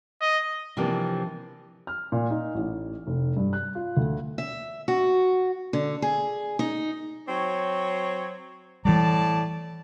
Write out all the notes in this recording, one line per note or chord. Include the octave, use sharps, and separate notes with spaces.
D#5
C3 E3 F3 A#3 C4 D4
F6
A#2
D#4
A1
F1
G2
F#6
F4
D2
E5
F#4
D3
G#4
D#4
F#3 C4 C#5
A2 E3 G3 D5 A5